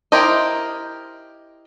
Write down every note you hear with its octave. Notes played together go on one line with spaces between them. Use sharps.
E4 G4 A#4 C5 D#5